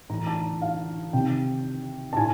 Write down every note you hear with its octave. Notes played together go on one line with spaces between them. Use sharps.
A2 E3 A#5
A5
F5
C3 D#3 G5
A5
A2 G#5